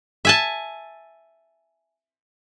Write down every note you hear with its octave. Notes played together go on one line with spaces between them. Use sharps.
E5 G#5 A5